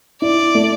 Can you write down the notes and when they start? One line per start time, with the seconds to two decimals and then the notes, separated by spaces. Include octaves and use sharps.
0.22 E4 D5
0.55 A3